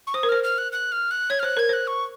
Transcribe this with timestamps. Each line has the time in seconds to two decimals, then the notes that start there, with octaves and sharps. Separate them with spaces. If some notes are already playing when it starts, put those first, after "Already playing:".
0.07 C#6
0.14 C5 D#6
0.23 A#4
0.29 C5 F6
0.43 F6
0.58 F#6
0.72 F#6
0.92 F6
1.11 F#6
1.30 C#5 G#6
1.39 F6
1.43 C5 F#6
1.57 A#4 G#6
1.69 C5 F#6
1.87 C#6